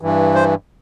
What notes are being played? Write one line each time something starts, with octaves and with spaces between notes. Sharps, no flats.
G2 E3
C5